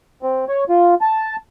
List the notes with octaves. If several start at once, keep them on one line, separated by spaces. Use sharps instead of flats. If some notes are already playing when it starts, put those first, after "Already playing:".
C4
C#5
F4
A5